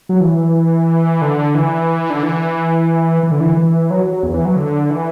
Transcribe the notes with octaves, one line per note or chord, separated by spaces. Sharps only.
F#3
E3
D3
E3
D3
E3
E3
D3
E3
E3
F#3
F#3
E2
E3
F#3
D3
E3